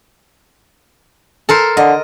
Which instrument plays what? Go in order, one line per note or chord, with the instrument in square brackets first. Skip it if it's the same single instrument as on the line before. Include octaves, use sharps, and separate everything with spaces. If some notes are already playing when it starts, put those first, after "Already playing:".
[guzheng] A4 A#4 C5
[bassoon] D3 [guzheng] D#5